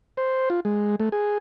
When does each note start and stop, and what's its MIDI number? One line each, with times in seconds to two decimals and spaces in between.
0.17 0.49 72
0.50 0.60 65
0.65 0.96 56
1.00 1.09 57
1.12 1.38 68